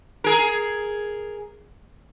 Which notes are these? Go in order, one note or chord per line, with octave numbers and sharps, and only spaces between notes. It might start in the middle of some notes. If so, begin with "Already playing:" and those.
G#4 A#4